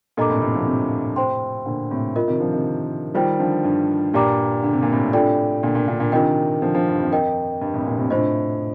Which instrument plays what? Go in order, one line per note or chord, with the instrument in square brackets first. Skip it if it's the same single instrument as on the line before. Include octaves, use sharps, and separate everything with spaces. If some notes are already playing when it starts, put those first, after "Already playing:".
[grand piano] G2 A#2 [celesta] A4 D#5 A#5 D6
[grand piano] F2 A2
A2 C3
D3 F3
A2 C3
[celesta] C5 G5 C6
[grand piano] A#2 D3
A2 C3
[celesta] F4 A#4 D#5
[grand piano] C3 D#3
D3 F3
C3 D#3
[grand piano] D#3 G3 [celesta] F4 C5 G5
[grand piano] D3 F3
G2
[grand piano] G2 A#2 [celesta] G4 D5 G5 A#5 D6
[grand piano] D3
C3
A#2
A2 C3
[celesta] D4 F4 A4 D5 G5
[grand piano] A#2 D3
A#2 D3
A#2 D3
A#2 D3
[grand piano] C3 D#3 [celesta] D4 F4 A#4 D#5 G5
[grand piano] D3 F3
D3 F3
G2
F2
[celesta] A#4 D#5 G5
[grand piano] G2
F2 A2
G2 A#2
A2 C3
[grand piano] A2 C3 [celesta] D4 F4 C5 D#5